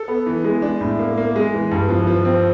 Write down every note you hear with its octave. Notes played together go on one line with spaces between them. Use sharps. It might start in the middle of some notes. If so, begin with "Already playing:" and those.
Already playing: A4
B3
E3
G#3
D4
A2
A#3
A#3
G#3
E3
G2
F3
F3
C4